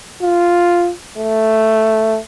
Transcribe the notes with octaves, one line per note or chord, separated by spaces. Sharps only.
F4
A3